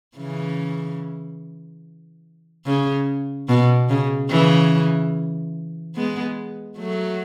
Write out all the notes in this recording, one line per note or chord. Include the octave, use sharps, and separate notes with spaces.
C#3 E3
C#3
B2
C#3
C#3 E3
G#3 B3
F#3 A3